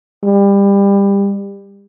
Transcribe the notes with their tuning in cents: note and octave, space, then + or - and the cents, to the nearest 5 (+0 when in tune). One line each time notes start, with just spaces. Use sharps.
G3 +25